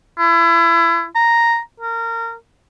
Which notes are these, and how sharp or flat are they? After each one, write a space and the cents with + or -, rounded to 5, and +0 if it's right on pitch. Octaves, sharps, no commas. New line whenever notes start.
E4 +30
A#5 +0
A#4 -25